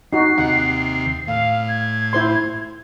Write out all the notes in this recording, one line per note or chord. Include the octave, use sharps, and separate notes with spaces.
D#4 F#4 C7
D#2 C3 F#5
A2 F5
G#6
E4 C5 C6